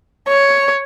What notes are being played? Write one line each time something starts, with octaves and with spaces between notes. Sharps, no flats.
C#5